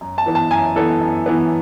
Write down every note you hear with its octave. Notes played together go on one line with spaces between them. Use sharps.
F#2
A5
E3 B3
A5
F#2 G#5
E3 B3 A4
F#2
E3 B3